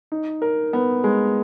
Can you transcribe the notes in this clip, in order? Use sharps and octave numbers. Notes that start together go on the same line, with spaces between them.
D#4
A#4
B3
G#3